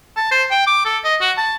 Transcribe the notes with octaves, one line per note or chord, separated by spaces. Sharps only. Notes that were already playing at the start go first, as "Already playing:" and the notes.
A5
C5
G5
D6
A4
D#5
F#4
A5